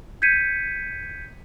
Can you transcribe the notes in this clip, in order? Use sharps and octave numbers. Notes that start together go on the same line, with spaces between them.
G6 G#6 B6 C#7 D#7